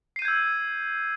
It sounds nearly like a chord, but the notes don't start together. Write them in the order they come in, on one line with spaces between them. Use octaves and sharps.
C7 D#7 G6 G#6 E6